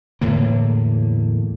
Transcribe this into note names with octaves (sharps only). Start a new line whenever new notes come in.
E2 A2 D3 A#3